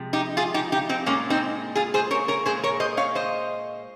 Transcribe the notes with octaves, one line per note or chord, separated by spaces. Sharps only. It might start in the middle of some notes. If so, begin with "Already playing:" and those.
Already playing: C3 F3 G#3
D#4 G4
F4 G#4
D#4 G4
D#4 G4
C4 D#4
A#2 G#3 A#3 C#4
C4 D#4
F4 G#4
G#4 C5
A#4 C#5
A#4 C#5
A#2 G#3 G#4 C5
A#4 C#5
C5 D#5
C#5 F5
C5 D#5